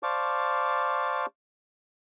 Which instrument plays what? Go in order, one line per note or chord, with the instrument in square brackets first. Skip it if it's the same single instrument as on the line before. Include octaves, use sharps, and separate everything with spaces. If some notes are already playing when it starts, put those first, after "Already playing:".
[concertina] C5 D5 F5 A5 C#6 D6